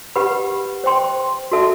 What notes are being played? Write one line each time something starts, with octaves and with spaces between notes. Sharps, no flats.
G4 B4 F#5 B5
C5 G5 C6
F#4 A4 E5 A5